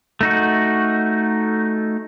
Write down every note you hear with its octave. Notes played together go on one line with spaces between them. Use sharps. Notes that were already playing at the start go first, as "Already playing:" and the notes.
A3 D#4 F#4